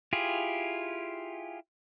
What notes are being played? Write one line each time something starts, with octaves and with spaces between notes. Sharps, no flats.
E4 F4 G4 G#4